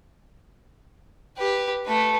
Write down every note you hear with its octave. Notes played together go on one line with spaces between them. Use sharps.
G4 B4
A3 B4